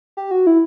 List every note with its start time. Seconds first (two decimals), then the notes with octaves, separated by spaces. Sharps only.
0.17 G4
0.31 F#4
0.47 E4